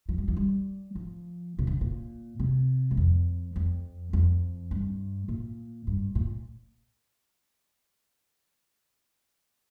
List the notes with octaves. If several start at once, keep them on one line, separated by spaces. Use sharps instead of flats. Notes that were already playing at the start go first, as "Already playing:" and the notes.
F3
G3
F3
G3
F3
C3
D3
A#2
C3
G2
F2
F2
F2
G2
A#2
G2
A#2